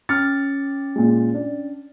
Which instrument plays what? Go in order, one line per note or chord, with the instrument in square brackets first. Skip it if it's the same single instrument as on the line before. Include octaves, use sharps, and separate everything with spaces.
[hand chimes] C#4 A6 [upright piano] D6 F6 C#7
[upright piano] A#2 G#3
D4